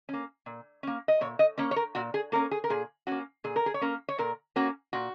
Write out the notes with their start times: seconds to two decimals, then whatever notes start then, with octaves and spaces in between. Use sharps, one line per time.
0.09 A#3 C#4
0.46 A#2
0.83 A#3 C#4
1.08 D#5
1.21 A#2 C#5
1.39 D#5
1.58 A#3 C#4 C#5
1.71 C#5
1.76 A#4
1.95 A#2 F#4
2.14 G#4
2.32 A#3 C#4 A#4
2.51 G#4
2.64 A#4
2.70 A#2 G#4
3.07 A#3 C#4 F#4
3.44 A#2 G#4
3.56 A#4
3.66 G#4
3.74 C#5
3.81 A#3 C#4 A#4
4.09 C#5
4.18 A#2 A#4
4.56 A#3 C#4 F#4
4.93 A#2 F#4